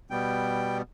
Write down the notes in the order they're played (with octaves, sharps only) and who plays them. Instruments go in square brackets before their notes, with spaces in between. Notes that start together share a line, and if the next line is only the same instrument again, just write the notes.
[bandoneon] B2 G3 B3 G5